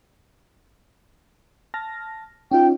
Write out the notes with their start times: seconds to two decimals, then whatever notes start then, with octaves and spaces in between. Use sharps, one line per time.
1.74 A5 F6 A#6
2.51 C#4 D#4 F4 G5